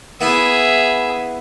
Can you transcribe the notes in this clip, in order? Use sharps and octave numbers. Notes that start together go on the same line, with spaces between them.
B3 E4 G#4 E5